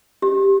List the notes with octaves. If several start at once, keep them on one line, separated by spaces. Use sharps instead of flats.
G4